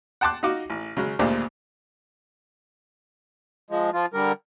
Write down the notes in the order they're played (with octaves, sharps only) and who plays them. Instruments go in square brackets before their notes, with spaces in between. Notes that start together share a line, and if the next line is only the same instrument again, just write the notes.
[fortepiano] F#5 G5 A5 C6 D6 F#6
D#4 F4 F#4 D6
A1
C#3 F#3 G#3
G#1 D2 A#2 D4 G4 C5
[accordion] F3 G#3
F3 F4
D3 G3 A#4